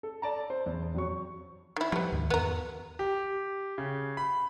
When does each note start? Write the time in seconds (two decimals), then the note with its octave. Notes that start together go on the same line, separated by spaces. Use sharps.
0.03 A4
0.22 D5 A5 A#5
0.50 C5
0.66 E2
0.94 F2 F#3 C#6
1.76 D#3 E4
1.92 F3 G3 B3
2.12 D2 G#2 D#3
2.30 E2 B3 A#4
2.99 G4
3.78 C#3
4.17 B5